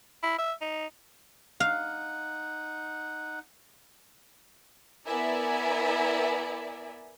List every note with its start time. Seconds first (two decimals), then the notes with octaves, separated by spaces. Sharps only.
0.23 E4
0.39 E5
0.61 D#4
1.60 D#4 F5 F#5
5.06 B3 E4 A#4 D5 E5 G#5